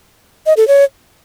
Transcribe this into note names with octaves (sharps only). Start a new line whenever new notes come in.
D#5
A4
C#5